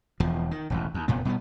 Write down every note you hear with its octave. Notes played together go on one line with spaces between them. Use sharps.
E1 E2 F3
D#3
E1 A1 E2
D#2
F1 F2 A#2 B3
B2 G3 G#3 B3